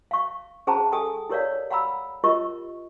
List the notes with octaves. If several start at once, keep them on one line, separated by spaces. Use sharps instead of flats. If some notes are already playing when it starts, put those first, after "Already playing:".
F5 C#6
C#4 G#4 C5 F#5 A5 A#5
G4 A4 G5 G#5 D#6
E4 G4 A#4 C#5 D5 F5
F5 F#5 A#5 B5 E6
F4 G4 A#4 D#5 C#6